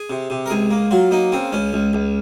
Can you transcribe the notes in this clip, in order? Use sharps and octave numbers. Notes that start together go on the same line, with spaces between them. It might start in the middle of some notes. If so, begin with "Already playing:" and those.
Already playing: G#4
C3
C3
A#4
C#2 G#4
A#3
F#3 F4
A#3 D#4
C#3 C4
C#2 C#4
C#2
C#2